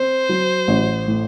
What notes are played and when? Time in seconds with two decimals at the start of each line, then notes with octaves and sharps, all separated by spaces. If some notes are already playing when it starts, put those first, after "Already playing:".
Already playing: C4 C5
0.29 F#3
0.68 A1
1.08 A2